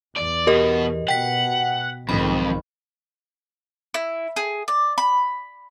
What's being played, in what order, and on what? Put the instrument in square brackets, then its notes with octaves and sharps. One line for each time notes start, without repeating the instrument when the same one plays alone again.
[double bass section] E2 [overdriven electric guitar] D5
[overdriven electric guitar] B2 [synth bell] G4 A#4 D#5
[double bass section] B2 [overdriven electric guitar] F#5 [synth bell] G5 B6
[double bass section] B1 G#2 D#3 [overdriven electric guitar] F2 [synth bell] B5
[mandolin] E4
G#4
D5
B5